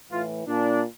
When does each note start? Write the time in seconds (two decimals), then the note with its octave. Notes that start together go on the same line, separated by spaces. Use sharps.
0.10 A2 E3 F4
0.47 A#2 D4